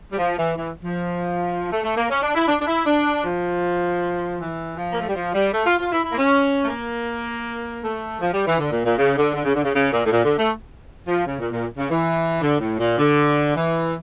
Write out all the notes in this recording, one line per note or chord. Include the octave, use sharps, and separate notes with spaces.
G3
F3
E3
E3
F3
A3
A3
A#3
C#4
D4
E4
D4
D4
E4
D4
F3
E3
F3
A#3
A3
G3
F3
G3
A3
F4
F4
E4
E4
A#3
C#4
A3
A#3
A3
F3
G3
E3
D3
A#2
A#2
C#3
D3
D3
C#3
D3
C#3
C#3
A#2
A2
A#2
D3
A3
F3
C#3
A#2
A#2
C#3
E3
D3
A2
A#2
D3
E3